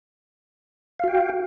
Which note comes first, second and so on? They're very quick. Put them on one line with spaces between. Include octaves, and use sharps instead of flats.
F5 F#4 G5